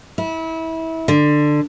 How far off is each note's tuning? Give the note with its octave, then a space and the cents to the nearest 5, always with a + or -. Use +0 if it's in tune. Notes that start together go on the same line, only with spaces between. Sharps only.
E4 -25
D3 +15